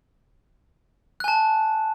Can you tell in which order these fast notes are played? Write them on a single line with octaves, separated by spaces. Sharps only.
F#6 G#5 A5